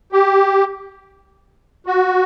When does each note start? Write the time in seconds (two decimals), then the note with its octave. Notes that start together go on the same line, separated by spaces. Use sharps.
0.12 G4
1.86 F#4